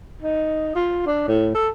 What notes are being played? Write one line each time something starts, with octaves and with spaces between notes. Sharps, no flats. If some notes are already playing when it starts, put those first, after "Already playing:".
D#4
F4
D4
A2
A4